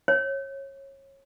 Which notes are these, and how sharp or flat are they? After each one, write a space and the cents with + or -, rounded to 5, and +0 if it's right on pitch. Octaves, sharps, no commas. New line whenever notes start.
C#5 -25